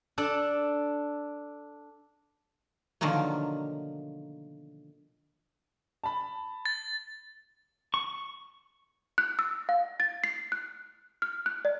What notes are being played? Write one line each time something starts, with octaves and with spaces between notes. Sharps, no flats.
D4 A4 D5
B2 D3 D#3 F3 F#3 A#3
A5 B5
A6
C#6
F#6
E6
F5
A6
C7
F#6
F6
F#6
D5